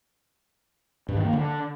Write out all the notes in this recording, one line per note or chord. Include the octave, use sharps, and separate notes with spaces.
G2
D#3
A#3
D3